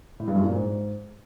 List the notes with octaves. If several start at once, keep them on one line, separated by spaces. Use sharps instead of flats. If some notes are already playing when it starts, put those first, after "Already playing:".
A2
G2
F#2
A#2
G#2